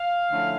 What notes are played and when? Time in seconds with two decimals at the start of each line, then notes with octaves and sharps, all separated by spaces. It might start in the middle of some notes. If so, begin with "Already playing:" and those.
Already playing: F5
0.30 D3 F3 A3 C#4 E4